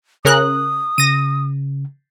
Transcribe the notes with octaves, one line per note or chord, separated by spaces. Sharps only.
C#3 A#4 D#6 F#6
C#3 A#6 D#7